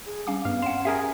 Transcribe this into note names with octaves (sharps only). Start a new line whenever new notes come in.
G#4
G3 C#4 F5 D6
G2 B3 F5
C#4 F#5 C6 E7
G4 G#4 A#4 E5
G#5